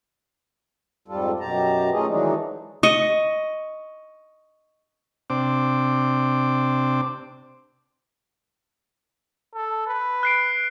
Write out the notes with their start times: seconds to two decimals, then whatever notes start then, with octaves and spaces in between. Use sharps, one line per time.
1.08 F2 G#2 G3 F4 A4
1.40 F#2 B2 G4 A5 A#5
1.92 A3 C#4 D#4 F4 G#4 D#5
2.07 D#3 E3 F#3 G#3 D4 D#4
2.83 D#5 C#6
5.30 C3 C4 D4 D6
9.54 A4
9.87 B4
10.23 F#6 C7 D7